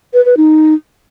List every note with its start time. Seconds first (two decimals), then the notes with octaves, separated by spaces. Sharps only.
0.14 B4
0.25 B4
0.37 D#4